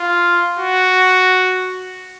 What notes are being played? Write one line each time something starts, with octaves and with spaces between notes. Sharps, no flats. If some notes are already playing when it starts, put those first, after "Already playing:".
Already playing: F4
F#4